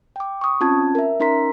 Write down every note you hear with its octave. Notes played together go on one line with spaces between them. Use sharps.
G5 D6
C#6 D#6
C4 C#4 F4 A5 G#6
A#4 E5
C#4 D#4 A#4 A#5 C6 B6